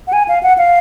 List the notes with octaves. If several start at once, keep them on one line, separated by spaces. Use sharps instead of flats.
F#5
G#5
F5
F#5
F5